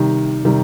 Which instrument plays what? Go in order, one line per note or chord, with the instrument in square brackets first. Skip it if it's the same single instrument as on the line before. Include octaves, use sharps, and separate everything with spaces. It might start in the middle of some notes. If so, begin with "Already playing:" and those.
Already playing: [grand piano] C3 D#3 G3
C3 D#3 G3